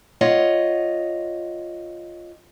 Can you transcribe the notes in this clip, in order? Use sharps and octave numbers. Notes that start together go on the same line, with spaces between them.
F4 C#5 D#5 F#5